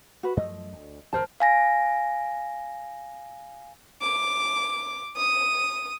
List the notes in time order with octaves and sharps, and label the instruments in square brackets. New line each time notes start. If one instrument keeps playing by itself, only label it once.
[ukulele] F#4 B4
[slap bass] F#2 F3 A3 [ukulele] D#5
[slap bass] D2
[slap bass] D1 G#1 F2 [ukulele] A#4 C5 A5
[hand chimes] F5 G#5 A#6
[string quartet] D6
D#6